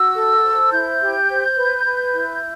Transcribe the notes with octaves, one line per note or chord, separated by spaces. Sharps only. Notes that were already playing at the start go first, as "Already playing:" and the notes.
Already playing: F#4 E6
A4
C5
E4 G6
G4
C5
B4
B4
E4